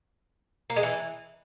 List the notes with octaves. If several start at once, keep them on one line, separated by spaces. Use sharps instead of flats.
A#3
G#3
E3